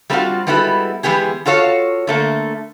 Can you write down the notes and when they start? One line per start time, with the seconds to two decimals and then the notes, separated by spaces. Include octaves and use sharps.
0.10 G3 A3 C4 D#4 F4 F#4
0.47 G3 G#3 B3 E4 F#4 A4
1.03 E3 G#3 B3 G4 G#4
1.45 F4 F#4 A4 C#5 F5
2.07 D3 A3 A#3